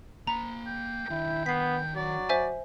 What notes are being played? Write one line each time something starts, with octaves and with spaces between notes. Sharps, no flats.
A#3 A#5 B5
G5
D#3 D4 E4
B3 B6 C7
F#3 D5
C5 E5 G#5